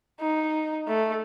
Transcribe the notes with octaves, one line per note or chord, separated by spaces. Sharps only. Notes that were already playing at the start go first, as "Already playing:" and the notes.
D#4
A3